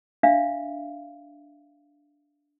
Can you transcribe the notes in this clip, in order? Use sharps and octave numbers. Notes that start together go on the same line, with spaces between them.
D4 E5 F5